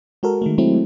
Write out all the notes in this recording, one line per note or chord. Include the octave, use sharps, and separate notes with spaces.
G#3 F#4 A4 A#4
D#3 G#3 A3
F#3 G#3 A3 C4 E4